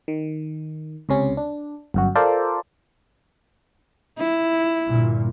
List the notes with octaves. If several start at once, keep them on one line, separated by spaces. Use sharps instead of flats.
D#3
C#2 C3 C#4
D4
G1 F#2 F#4
F4 A4 A#4 C5 D5
E4
G1 A#2